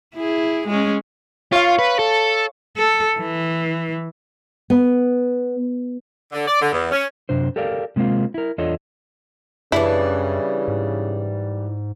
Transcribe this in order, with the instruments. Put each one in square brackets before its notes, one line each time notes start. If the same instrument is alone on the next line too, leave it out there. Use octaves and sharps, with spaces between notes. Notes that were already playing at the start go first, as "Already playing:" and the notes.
[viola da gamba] E4 G#4
G#3 C#4
[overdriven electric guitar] F4 [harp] C#5 F5
[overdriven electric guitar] B4
A4
[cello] A4
E3
[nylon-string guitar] B3
[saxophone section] D3
D5
D3
E2
C#4
[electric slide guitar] F#2 C3 D4 C5
G4 A4 A#4 D5 F5
C3 G#3 A#3 C4 F4
E4 A#4
E2 D4 F4 A4 C#5 D#5
[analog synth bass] F#2 [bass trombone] C#3 [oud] E3 G3 D4 [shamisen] E4
[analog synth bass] G#2